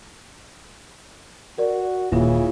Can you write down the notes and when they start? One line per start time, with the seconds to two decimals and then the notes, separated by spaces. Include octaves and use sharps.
1.58 F#4 A#4 D5
2.12 D#1 C#3 E3 A#3 F4